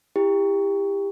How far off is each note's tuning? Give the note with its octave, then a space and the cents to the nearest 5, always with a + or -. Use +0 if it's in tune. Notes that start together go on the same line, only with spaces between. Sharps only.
E4 +0 G4 +25